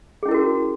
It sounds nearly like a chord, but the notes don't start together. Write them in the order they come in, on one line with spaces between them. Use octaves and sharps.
G#4 C#4 E4 A#4 F#4